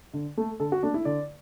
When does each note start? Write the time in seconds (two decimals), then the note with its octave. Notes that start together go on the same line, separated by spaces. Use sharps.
0.14 D3
0.37 A3
0.60 D3 A4
0.72 F#4
0.83 A3 D4
0.94 E4
1.05 D3 D5